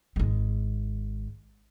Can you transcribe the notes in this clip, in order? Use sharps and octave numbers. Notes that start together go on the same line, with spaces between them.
G#1 G#3